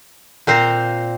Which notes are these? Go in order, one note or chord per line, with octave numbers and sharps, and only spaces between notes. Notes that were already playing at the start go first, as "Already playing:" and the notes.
A#2 C4 C5 A#5